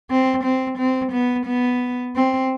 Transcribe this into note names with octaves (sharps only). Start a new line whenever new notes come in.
C4
C4
C4
B3
B3
C4